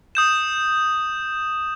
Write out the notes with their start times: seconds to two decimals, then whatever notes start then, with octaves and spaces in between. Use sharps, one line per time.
0.15 D#6 G6 E7